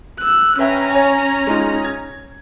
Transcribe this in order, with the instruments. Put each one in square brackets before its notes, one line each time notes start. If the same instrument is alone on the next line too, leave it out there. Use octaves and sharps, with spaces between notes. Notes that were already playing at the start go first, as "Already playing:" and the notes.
[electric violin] E6 F#6
[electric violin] C#4 A#5 [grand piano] B4 E5 G5
[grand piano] C#5 G#5
G#3 D#4 F4
G#6